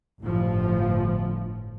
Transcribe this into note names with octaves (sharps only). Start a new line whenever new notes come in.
G1 A2 F3